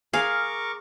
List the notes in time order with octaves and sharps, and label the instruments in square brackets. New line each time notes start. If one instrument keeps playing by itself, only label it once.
[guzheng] G#4 [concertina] A#4 C#6 D6 [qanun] F5